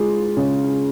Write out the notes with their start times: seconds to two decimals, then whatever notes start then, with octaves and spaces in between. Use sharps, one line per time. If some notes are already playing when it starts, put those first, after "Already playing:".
Already playing: G#3 F4
0.37 C#3